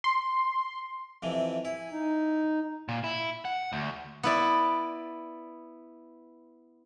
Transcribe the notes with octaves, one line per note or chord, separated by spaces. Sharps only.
C6
F2 C3 E3
E4 G#5
D#4
A#2
E4
F#5
D2
B3 E4 D5